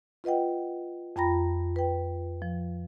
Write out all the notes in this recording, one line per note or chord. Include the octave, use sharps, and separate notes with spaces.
F4 B4 D#5 F#5 G5
F2 F4 G5 A#5 B5 A#6
B4 G5
F3